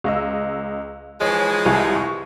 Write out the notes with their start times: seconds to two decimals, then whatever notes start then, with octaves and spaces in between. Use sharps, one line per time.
0.04 C#2 D#5 E6
1.21 E3 F3 G#3 C#5
1.66 C2 G#5
1.96 C#6